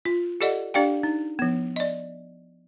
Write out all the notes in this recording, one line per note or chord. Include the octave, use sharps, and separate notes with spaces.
F4
G4 A4 D5 D#5 F#5
D4 G4 D5 F5 G5
D#4
F3 B3
D5 D#5